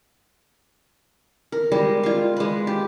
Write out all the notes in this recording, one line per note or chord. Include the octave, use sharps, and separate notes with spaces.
A#4
G3 G#3
F4 F5
G#3 B4
G4